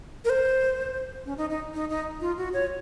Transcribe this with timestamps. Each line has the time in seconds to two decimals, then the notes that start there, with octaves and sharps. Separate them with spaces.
0.25 A#4
0.30 C5
1.25 C#4
1.37 D#4
1.50 D#4
1.74 D#4
1.90 D#4
2.21 F4
2.38 F#4
2.53 C#5